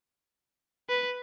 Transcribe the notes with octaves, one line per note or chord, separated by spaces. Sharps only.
B4